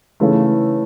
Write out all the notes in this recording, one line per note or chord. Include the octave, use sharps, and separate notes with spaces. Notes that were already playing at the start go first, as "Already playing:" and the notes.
C#3 E3 A3